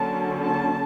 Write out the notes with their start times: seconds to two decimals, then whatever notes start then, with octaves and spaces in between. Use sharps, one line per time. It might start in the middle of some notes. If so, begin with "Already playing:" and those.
Already playing: D3 F#3 A#3 C#4 A5
0.44 A5